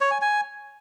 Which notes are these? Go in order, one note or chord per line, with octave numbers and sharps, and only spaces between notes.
C#5
G#5
G#5